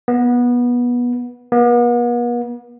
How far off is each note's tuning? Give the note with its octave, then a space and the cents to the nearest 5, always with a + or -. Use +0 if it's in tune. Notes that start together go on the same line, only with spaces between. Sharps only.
B3 -20
B3 -45